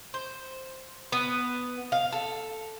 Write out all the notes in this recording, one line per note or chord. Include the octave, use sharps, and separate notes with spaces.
C5
B3
F5
A4